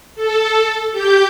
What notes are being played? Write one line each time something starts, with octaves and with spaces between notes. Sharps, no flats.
A4
G4 G6